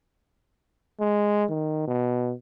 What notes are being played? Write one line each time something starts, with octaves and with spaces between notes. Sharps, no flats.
G#3
D#3
B2